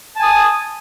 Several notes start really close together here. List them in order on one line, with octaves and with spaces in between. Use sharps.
A5 G#5 D#6